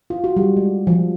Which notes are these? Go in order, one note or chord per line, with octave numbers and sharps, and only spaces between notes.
F4
F#4
G3
G#3
F3